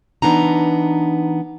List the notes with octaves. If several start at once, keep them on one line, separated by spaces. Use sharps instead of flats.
E3 B3 D4 D#4 A#5